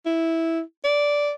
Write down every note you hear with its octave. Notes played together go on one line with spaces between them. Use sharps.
E4
D5